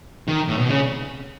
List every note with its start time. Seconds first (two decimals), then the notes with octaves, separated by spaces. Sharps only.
0.28 D#3
0.48 A2
0.58 B2
0.67 C#3